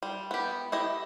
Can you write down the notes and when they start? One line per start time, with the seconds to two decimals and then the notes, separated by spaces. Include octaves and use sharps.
0.03 G3
0.31 B3 G4
0.72 E4 G4 D#5